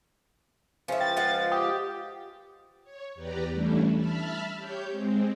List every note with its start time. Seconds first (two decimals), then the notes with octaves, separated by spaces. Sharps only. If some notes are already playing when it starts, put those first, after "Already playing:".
0.88 C#2 F3 C#4 E4
1.01 G5 A6
1.16 G#3 F4 F#5
1.52 G4 D#6
2.84 C#5
3.15 E2 G4 B4 D5 A#5
3.52 E3 G3 A3 C#4 D4 E4
3.94 E5 A5 B5 F6
4.56 G4 C#5 G6
4.89 G#3 C4